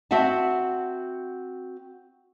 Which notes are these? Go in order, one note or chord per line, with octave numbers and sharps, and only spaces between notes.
C4 F#4 E5 F#5 A5